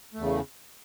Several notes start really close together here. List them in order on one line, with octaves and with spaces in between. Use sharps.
A3 E2 C#3